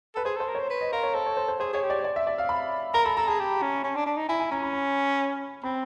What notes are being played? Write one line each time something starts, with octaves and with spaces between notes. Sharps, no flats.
A4 B4
G#4 C5
A4 C5
A#4
C5 C#5
B4
D#5
A#4 F5
C#5
A4 C5
C#5
C5
C5
G#4 C5
G#4 C#5
G4
D5
D5
E5
D5
F5
B5
A#4 A#5
A4 B5
A4 A#5
G#4 A5
G4
C#4
C#4
D4
D4
D#4
E4 G#5
G#5
C#4 A#5
B5
B5
C4 B5